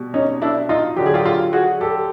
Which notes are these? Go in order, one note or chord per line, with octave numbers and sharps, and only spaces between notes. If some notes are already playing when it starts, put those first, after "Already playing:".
Already playing: B2 G3
C#4 D#4
D4 E4
D#4 F4
D3 F#3 G4
G#4
F4 G4
F4 G4
F#4 G#4
G4 A4